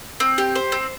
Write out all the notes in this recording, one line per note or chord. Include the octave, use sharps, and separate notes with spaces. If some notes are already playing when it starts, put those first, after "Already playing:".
C4
G4
C5
C4